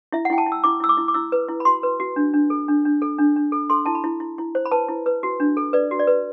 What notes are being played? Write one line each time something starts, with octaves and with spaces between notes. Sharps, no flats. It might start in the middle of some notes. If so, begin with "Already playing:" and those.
E4 E5
F#5
E4 G5
A5
E4
E6
E4 D6
E4 E6
D6
E4
D6
E4 E6
B4
E4
B5
F#4 C6
B4
F#4
D4
D4
A4
D4
D4
A4
D4
D4
A4
A4 C6
E4 A5
B5
E4
E4
E4
C5
B5
B4 A5
E4
B4
F#4
D4
A4
B4 D5
F#4
D5
B4